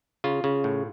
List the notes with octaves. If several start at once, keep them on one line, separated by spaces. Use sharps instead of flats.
C#3 F4
C#3
A2